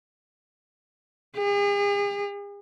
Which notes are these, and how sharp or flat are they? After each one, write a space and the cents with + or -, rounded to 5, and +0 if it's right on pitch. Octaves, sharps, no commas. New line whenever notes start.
G#4 -45